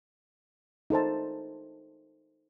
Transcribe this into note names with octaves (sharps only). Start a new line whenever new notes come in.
D#4 A4 C5 A5